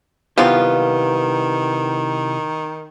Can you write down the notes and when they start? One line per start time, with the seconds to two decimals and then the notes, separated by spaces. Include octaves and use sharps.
0.38 C3 D#3 F3 B3 C4 E4 F4 G4